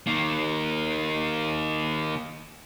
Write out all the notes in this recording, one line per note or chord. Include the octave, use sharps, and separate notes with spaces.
D#3 A#3